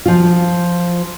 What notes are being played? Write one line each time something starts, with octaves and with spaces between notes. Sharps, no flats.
F3 F4